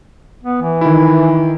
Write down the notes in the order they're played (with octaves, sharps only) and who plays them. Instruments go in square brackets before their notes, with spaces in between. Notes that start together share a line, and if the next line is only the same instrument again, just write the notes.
[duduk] B3
E3
[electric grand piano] D#3 E4